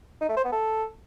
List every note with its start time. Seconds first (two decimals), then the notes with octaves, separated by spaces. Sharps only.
0.21 D#4
0.29 A3
0.37 C5
0.44 B3
0.52 A4